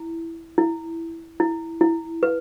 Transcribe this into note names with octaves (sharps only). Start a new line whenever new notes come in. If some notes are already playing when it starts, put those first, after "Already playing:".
Already playing: E4
E4
E4
E4
B4